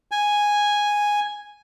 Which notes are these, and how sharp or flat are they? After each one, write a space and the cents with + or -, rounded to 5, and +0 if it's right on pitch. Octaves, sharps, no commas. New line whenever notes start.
G#5 -5